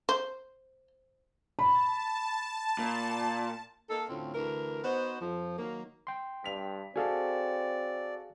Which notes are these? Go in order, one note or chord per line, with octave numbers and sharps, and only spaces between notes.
C5
A5 B5
A#2
A#3 D#4 A4
D2 A2 C4 C#4 F4
D2 E3 A#4
B3 D#4 F#4 C5
F2 F3
D#3 F#3 A#3
G5 C6
G2 B6 F7
C4 F#4 G#4 A4 D5 F5 G#5